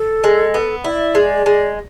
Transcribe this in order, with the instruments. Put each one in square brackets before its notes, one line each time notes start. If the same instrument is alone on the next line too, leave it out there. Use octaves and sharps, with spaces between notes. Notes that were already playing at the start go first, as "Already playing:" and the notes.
Already playing: [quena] A4
[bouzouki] G#3
B3
[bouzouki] E4 [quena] D5
[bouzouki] G#3
G#3